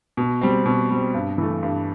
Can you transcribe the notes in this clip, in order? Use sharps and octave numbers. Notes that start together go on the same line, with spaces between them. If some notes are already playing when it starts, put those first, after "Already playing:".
B2
G3 C4
B2
G3 C4
G2
E3 A3
G2